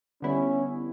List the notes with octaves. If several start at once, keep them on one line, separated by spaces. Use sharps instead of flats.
D3 G3 B3 C#4 E4